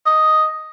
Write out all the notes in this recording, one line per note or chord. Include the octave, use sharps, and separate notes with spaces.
D#5